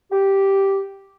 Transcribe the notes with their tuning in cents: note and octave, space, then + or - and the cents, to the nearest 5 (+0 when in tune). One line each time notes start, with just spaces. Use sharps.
G4 -5